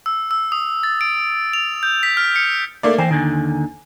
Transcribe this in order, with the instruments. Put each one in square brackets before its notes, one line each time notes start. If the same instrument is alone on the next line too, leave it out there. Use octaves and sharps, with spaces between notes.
[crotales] E6
E6
D#6
A6
D7
F7
G6
B6
F6
C#7
[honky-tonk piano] A3 A#3 D5
[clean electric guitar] E3 C5 G5 [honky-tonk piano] G#5
[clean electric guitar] D#2 D3 D#3